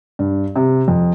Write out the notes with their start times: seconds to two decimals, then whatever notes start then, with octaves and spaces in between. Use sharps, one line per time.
0.19 G2
0.56 C3
0.88 F2